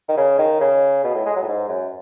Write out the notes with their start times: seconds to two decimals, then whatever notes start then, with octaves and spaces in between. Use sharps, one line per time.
0.09 D#3
0.17 C#3
0.39 D#3
0.61 C#3
1.04 B2
1.15 A2
1.25 G#3
1.36 F#3
1.42 A2
1.48 G#2
1.69 F#2